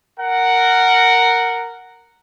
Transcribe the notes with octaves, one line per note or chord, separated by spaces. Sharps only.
A#4 F#5